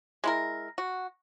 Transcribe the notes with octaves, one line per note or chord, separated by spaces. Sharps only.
G#3 E4 A#4
F#4